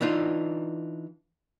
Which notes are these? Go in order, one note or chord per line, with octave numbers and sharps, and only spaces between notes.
E3 D4 D#4 F4